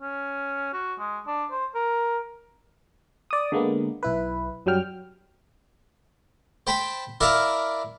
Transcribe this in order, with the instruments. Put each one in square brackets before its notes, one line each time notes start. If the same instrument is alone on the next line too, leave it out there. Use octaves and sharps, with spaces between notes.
[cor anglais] C#4
F#4
G#3
D4
C5
A#4
[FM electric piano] D5 D#6
D3 G#3 A#3 B3
B1 E4 B4
F#2 F#3 G3 G5 F6
[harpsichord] C5 G5 A5 B5
E4 A#4 D5 F5 A5 A#5